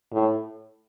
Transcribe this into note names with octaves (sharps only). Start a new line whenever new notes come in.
A2